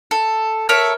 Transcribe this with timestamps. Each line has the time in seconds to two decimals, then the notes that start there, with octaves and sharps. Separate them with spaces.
0.11 A4
0.69 A4 A#4 C#5 E5